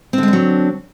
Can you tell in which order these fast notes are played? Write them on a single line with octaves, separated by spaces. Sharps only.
C4 D3 G#3 D4 F#3